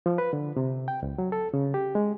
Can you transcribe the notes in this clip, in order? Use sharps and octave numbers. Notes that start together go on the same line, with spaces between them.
F3
B4
D3
C3
G5
C#2
F#3
A4
C#3
G4
G#3